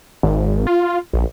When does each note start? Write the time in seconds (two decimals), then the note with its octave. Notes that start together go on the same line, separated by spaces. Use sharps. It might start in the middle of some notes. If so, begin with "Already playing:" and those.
0.23 G#1
0.67 F4
1.13 A#1